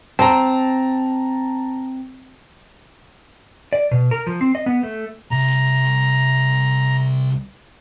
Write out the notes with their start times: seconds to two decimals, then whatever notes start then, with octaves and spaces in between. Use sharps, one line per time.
0.19 C4 A5 A#5
3.73 D5
3.91 B2
4.11 A#4
4.27 F3
4.41 C4
4.55 D#5
4.66 B3
4.83 A3
5.31 C2 A#5